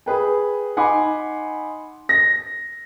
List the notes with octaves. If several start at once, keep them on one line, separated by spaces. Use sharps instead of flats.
G#4 B4 G5
D#4 F#5 G#5 B5 C6 D6
A#6